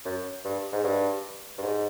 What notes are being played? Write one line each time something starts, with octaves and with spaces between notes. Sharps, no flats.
F#2
G2
G#2
G2
G2
G#2